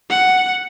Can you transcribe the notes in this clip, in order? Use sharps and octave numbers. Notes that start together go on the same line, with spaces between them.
F#5